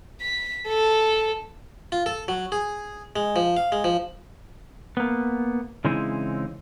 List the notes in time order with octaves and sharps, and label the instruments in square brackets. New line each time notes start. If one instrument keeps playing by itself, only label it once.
[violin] B6
A4
[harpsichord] F4
A4
F#3
G#4
G#3
F3
F5
G#3
F3
[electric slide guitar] A#3 B3
C#3 E3 G#3 C4 D#4 E4